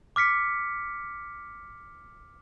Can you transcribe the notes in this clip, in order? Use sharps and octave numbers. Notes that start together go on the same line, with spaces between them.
D6 F6 B6 C#7